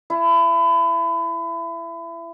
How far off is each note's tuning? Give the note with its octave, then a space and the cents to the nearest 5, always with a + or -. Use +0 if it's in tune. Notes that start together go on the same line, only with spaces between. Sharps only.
E4 +30